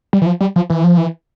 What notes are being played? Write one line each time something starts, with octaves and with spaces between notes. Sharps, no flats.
G3
E3
F3
G3
F3
E3
F3
E3